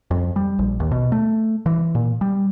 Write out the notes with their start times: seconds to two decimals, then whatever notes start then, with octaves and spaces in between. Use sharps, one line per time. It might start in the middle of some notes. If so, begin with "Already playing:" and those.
0.11 F2
0.36 G3
0.59 A#1
0.80 D#2
0.91 B2
1.12 A3
1.66 E3
1.95 A#2
2.21 G3